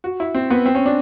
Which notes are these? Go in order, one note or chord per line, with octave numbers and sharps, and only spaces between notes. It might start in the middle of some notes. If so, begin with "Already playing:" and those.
F#4
E4
C4
B3
C4
C#4
D4